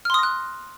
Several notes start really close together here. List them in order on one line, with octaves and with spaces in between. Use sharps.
F6 C6 D#6 A#6 F#6